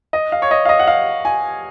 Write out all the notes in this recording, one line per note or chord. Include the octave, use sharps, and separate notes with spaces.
D#5
F5
C#5
D#5
F5
D#5
F#5
F5
G#5